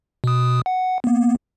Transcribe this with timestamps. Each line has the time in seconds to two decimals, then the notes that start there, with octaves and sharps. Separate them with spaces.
0.24 B2 D#6
0.66 F#5
1.04 A#3 B3